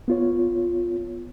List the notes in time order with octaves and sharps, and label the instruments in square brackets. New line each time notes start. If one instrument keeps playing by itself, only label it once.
[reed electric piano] B3 F4 C#5